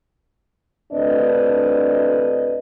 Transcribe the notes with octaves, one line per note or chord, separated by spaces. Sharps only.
D2 A2 C4 D4 B4 D#5